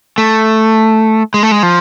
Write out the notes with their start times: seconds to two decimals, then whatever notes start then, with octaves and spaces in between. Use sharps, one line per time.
0.18 A3
1.34 G#3
1.43 A3
1.52 G#3
1.63 F3